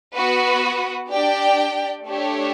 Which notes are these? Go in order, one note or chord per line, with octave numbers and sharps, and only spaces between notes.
B3 F#4 B4 F#5
D4 G4 D5 G5
A3 D4 G4 C#5